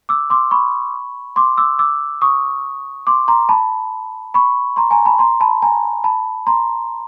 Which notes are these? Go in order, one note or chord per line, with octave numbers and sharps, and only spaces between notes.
D6 E6
C6 D6
B5 C#6
C6 D6
D6 E6
D6 E6
C#6 D#6
C6 D6
A#5 C6
A5 B5
B5 C#6
A#5 C6
G#5 A#5
A5 B5
A#5 C6
A5 B5
G#5 A#5
A5 B5
A#5 C6